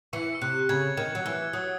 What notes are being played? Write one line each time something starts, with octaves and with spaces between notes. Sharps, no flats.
E3 C#6 C#7
E6
C3 F#6
F#6
C#3 G#6
D#3 G#6
F#3
E3 E6
F#3 D#6